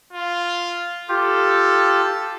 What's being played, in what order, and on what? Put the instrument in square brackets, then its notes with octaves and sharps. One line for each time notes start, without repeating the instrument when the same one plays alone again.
[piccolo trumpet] F4
[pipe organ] F4 G4 [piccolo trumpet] A4